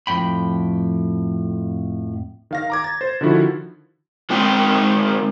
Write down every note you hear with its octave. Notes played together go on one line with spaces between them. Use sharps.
F2 A2 G5 B5
D#3 F5 A#6
A#5 D6 G#6
A6
C5
D3 D#3 F3 E4 F#4
D#3 G#3 C4 A#4 G5